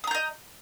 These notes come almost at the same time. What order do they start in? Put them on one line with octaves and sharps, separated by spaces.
D#6 A#5 G6 D#5